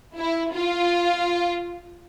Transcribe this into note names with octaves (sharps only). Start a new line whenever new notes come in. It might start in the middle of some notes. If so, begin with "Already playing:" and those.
E4
F4